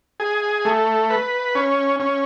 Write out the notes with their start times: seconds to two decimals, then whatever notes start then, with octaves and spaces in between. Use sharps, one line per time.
0.20 G#4
0.65 A3
1.10 B4
1.55 C#4
2.00 C#4